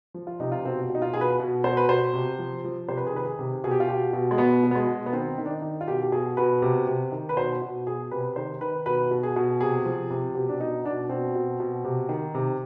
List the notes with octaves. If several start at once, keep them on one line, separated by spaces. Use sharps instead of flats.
F3
F4
C3 D#4
F4
B2 C4
B2
D#4
F4
B2 G#4
B4
B2
B2 C5
B4
B2 C5
C3
F3
F3
C3 C5
B4
G#4
D#3 B4
G#4
C3
B2 G#4
G4
F4
B2 G4
B2
G#3
B2 B3
B2
B3
G#3
B2
B3
D#3 C4
D#3
D4
D#4
D#3
F4
B2 G4
G4
B2 G#4
B2 B4
C3
C3
D#3
B4
B2 C5
B2
B2 G#4
C3 B4
D#3 C5
D#3 B4
B2 B4
B2
G#4
B2
C3 G#4
F3
C3
B2 G4
D4
B2 D#4
B2 D4
B2 C4
B2
B2
C3
D#3
C3